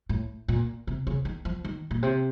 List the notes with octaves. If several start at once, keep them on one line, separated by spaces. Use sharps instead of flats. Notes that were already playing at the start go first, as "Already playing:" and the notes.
A2
A#2
C3
C#3
D#3
F3
D#3
A#2
C3